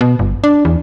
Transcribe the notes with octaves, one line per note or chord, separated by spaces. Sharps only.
B2
G1
D4
E2